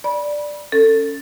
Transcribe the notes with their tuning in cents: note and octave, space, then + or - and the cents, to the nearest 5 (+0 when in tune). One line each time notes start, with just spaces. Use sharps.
D5 +5 B5 -30
C#4 +0 A4 +25